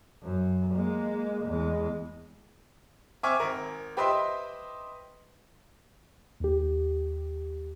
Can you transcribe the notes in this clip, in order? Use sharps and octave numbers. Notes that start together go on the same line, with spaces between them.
F#2
G#3 A#3
E2 G#3
C4 E5 G#5 C#6 D6 F6
G#1 A#4
G4 B4 C5 D#5 E5 C6
D#2 G4